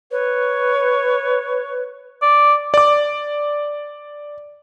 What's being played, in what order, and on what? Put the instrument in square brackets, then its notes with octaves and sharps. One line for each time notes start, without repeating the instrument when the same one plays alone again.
[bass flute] B4 [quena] C#5
[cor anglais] D5
[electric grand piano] D5 D6